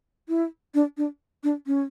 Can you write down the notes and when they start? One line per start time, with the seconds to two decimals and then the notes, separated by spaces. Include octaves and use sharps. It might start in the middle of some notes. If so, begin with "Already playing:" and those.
0.29 E4
0.74 D4
0.97 D4
1.44 D4
1.67 C#4